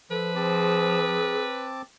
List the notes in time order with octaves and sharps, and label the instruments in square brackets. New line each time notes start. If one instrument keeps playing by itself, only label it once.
[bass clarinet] F3 [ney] A4 [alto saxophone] B4
[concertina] C4 A5 D6 [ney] G#4